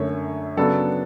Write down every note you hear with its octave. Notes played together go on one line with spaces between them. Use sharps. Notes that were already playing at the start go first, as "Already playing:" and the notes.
Already playing: F#2 D3 A3 C#5
C#3 F#3 B3 D4 A4